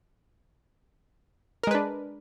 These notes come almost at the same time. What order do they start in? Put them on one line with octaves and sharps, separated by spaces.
A#4 G#3 B4 D4